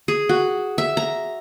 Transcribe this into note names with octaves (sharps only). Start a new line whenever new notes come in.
G#4
F#4
E5
A#5